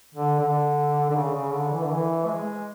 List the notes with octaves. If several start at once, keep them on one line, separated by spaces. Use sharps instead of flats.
D3
D3
D3
C#3
C#3
D3
E3
D3
E3
A3
G#3